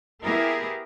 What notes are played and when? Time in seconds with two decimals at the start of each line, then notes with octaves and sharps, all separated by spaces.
0.22 B3 E4 G4 G#4 A#4